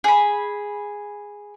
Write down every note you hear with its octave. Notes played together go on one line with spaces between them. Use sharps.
G#4 B5